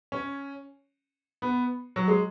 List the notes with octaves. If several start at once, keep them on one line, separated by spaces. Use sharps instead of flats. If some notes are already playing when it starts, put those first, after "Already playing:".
C#4
B3
F#3
G#3